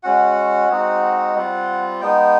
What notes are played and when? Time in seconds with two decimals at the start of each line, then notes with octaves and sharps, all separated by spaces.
0.03 G#3 C#4 F#4 F#5
0.69 G#3 C4 D#4 F#4
1.35 G3 C4 F4
2.01 G#3 B3 D#4 G5